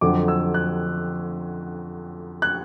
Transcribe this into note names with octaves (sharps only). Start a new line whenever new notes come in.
F2 D3 F#3 D6
E6
F#6
F#6